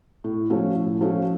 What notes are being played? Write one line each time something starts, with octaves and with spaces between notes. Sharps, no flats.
A2
F3 A3 C#4 F#4
A2
F3 A3 C#4 F#4